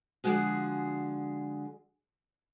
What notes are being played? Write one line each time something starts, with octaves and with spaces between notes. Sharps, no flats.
D3 F3 G#3 F#4 G#4